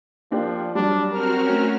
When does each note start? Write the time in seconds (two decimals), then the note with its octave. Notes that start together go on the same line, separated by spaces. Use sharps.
0.31 F3 A#3 D4 G4
0.75 F#3 G3 D4
1.13 C4 F#4 A#4 F6
1.45 A3 C#4